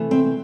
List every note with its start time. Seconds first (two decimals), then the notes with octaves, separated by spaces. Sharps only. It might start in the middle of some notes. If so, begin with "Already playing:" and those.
Already playing: C3 E3 A3
0.11 C4